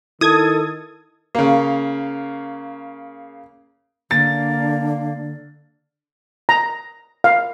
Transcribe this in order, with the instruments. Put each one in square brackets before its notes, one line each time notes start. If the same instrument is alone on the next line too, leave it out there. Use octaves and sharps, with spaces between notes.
[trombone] D#3 [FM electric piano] E4 [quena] A4 [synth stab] D#6 G#6
[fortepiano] C#3 A#3
[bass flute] D3 [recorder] A#3 [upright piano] A6
[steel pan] A#5
F5